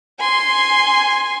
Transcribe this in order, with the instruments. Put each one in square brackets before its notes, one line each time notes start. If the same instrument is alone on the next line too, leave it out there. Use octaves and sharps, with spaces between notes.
[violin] G#5 C6